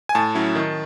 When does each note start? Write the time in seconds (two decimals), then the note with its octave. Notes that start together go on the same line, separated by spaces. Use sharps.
0.09 G#5
0.15 A2 A5
0.35 F#3 C#4 E4
0.55 D#3